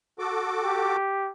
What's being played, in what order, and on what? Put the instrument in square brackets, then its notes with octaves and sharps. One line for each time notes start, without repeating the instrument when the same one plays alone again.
[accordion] F#4 A4 D6
[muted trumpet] G4